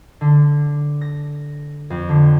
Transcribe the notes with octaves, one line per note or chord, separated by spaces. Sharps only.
D3
A#6
F2
D3